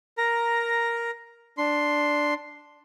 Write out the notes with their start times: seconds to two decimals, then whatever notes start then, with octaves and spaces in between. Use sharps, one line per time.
0.18 A#4 A#5
1.58 D4 C6